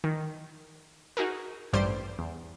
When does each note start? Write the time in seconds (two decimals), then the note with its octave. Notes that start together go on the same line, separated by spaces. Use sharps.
0.04 D#3
1.17 D#4 F#4 G#4 A#4
1.73 A1 G2 G3 C5 C6 D7
2.18 E2